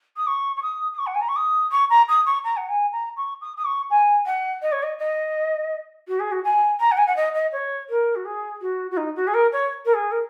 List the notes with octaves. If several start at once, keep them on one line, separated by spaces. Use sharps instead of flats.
D#6
C#6
C#6
D#6
D#6
C#6
F#5
G#5
A#5
C#6
D#6
C#6
A#5
D#6
C#6
A#5
F#5
G#5
A#5
C#6
D#6
D#6
C#6
G#5
F#5
D#5
C#5
D#5
D#5
F#4
G#4
F#4
G#5
A#5
F#5
G#5
F#5
D#5
D#5
C#5
A#4
F#4
G#4
F#4
F#4
D#4
F#4
G#4
A#4
C#5
A#4
G#4
A#4